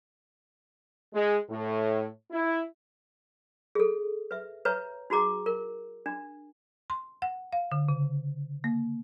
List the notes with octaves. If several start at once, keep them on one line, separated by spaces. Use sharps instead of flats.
G#3
A2
E4
G#4 A4
B4 E5
B4 C#5 E5 A#5
D#4 F#4 G#4 A#5 D6
A#4
D4
C6
F#5
F5
D3
C#3
A#3